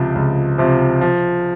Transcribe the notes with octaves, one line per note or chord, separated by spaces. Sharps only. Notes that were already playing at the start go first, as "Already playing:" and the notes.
Already playing: C#2 C3 F3
C#2
C3 F3
F3